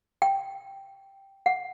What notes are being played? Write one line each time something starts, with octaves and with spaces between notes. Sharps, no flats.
G5
F#5